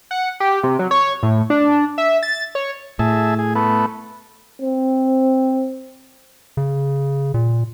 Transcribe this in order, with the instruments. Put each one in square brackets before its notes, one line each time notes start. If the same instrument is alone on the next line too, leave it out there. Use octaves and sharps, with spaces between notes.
[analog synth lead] F#5
G4
C3
F#3
C#5
A2
D4
E5
A6
C#5
[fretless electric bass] A2 [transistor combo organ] G#4 E5 A5
[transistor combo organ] G#4
A3 B3
[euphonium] C4
[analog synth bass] C#3
A#2